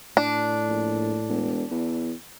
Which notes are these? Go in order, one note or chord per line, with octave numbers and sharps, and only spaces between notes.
A2 D4
A#1
E1
E2